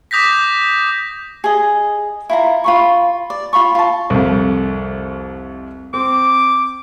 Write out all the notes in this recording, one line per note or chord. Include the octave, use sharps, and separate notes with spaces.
D6 D#6 G6 A#6 B6
G#4 D#5
E4 F4 A#5
F4 B5 C#6
D5
F4 F5 B5 C#6
F4 A5
C2 F2
C4 D6